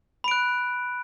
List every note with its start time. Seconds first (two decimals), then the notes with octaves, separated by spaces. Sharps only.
0.24 B5
0.28 D7
0.31 F#6